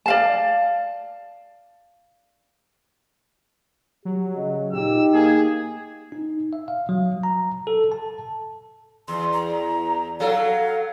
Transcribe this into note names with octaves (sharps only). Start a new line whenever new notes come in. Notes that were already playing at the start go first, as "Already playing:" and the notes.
D5 F5 A5
F#3 G4
C#3 D#5
A#2 D#4 G4 E6
A#3 G#4
D#4
E5
F5
F#3
A#5
A4
A5
E2 C6
A#5
F#3 A4 F5